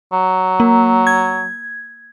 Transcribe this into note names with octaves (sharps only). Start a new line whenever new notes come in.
F#3
A#3
G#6